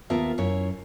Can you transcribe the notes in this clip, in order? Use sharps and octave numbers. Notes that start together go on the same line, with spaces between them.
D#2 B3 F4 A#4 E5 A5
F#2 E4 F4 C#5